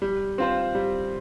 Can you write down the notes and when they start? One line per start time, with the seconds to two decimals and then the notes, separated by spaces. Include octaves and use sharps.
0.02 G3
0.38 C4 F4 C5
0.75 G3